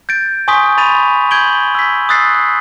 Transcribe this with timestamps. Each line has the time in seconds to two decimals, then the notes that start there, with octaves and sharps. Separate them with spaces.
0.09 G6 A6 D7
0.48 G#5 C6 C#6 D#6 G6 B6
0.78 B5 A6 D#7 F7
1.31 G6 G#6 D7 F#7 G7
1.75 E6 B6
2.09 D#6 E6 F#6 A6 B6 C7